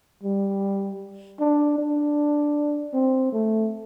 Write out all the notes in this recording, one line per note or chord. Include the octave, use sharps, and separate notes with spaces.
G3
D4
D4
C4
A3